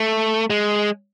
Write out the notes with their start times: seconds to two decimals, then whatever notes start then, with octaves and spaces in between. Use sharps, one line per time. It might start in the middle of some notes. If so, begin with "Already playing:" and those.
Already playing: A3
0.50 G#3